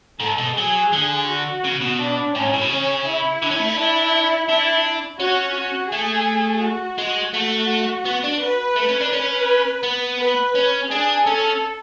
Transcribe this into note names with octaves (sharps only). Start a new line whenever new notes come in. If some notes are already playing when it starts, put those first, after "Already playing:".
G#2 A4
B2
F#3 G#4
D3
F#4
C#3
B2
D4
A2 C#4
G#2
A2
B2
C#3 C#4
E4
D3
C#4
A3
C#4
D4 E4
D4 E4
C#4 F#4
F#4
A3 G#4
F#4
G#3
A3 F#4
B3
D4
B4
A3
C#4
D4
C#4 B4
B3
B4
C#4
D4 G#4
C#4 A4